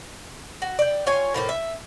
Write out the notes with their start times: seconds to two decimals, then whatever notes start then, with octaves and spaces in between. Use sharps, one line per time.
0.62 F#4
0.79 D5 G5
1.07 F4 C#5 G#5
1.34 A2 F3 A#3
1.49 E5